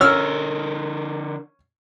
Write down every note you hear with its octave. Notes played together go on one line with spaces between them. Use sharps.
D3 C#4 A#4 E6 F6